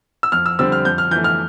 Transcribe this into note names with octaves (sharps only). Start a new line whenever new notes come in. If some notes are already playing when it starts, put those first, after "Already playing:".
E6
F2 F6
E6
D3 G3 C4 E6
F6
F2 G6
F6
E3 A3 G6
F6